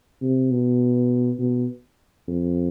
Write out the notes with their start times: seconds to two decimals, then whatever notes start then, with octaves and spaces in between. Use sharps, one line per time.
0.22 C3
0.51 B2
1.39 B2
2.28 F2